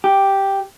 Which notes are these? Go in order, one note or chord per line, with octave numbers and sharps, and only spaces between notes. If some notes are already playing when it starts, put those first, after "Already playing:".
G4